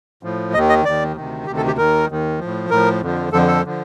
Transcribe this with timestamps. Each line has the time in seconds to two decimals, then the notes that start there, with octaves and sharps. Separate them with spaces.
0.23 A2 F3
0.54 D#2 D#3 D#5
0.69 D#5
0.85 D#2 D#3 D5
1.16 D2 C3 D#3
1.47 D2 C3 D#3 G4
1.57 A4
1.67 G4
1.78 D#2 D#3 A#4
2.09 D#2 D#3
2.39 A2 F3
2.70 A2 F3 A#4
3.01 F2 D3 F3
3.32 F2 D3 F3 A4
3.48 A4
3.65 D3 F3